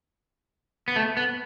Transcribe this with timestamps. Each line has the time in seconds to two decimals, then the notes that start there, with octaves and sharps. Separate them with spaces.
0.88 B3
0.96 A3
1.17 B3